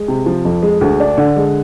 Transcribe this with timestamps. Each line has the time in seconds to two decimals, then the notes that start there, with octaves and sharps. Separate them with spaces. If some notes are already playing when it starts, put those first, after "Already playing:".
Already playing: G#3
0.08 C3
0.26 F3
0.45 F2
0.63 G#3
0.81 D2
1.00 D4
1.18 D3
1.36 G#3